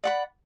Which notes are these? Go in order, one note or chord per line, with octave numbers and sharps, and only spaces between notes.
D5 F#5 B5